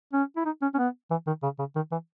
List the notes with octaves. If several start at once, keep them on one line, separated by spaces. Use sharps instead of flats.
C#4
E4
D#4
C#4
C#4
B3
E3
D#3
C#3
C#3
D#3
E3